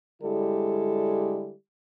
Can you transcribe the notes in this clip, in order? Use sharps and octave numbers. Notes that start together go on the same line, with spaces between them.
D3 G3 G#3 E4 G4 A4